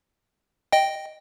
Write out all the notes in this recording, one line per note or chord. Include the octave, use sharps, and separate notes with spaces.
D#5 G5